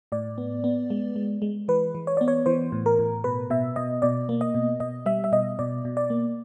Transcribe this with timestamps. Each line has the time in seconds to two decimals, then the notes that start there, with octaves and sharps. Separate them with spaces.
0.12 A2 D5
0.38 B3
0.64 B3
0.90 G#3
1.16 G#3
1.42 G#3
1.68 E3 B4
1.95 E3
2.07 C#5
2.17 B3 D5
2.28 C#5
2.46 E3 C5
2.72 A2
2.86 A#4
2.99 A2
3.24 B2 B4
3.50 B2 E5
3.76 B2 D#5
4.02 B2 D5
4.29 A#3
4.41 D#5
4.54 B2
4.80 B2 D#5
5.06 G3 E5
5.24 E5
5.32 B2 D#5
5.59 B2 D5
5.85 B2
5.97 D5
6.10 A#3